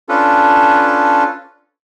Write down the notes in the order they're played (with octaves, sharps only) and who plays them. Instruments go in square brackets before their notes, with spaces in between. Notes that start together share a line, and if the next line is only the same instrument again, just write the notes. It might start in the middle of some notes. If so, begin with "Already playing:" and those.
[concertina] C#4 D4 F4 A4 B4